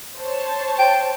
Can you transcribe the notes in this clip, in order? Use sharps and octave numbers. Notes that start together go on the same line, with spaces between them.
C5 C#5 A5
G5